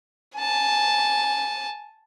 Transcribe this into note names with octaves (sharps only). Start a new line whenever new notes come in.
G#5 A5